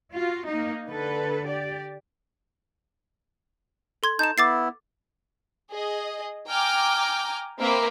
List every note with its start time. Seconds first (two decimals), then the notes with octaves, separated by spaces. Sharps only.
0.13 F4 F#4
0.47 A#3 D#4
0.86 D3 A4 B4
1.48 G4 D5
4.03 A4 C6 G#6
4.19 D#4 A5 G6 E7
4.38 B3 E4 D6 A6 C7
5.70 G#4 D#5
6.50 G5 G#5 A#5 D6 F6
7.59 A#3 C4 A#4 B4 E5 D6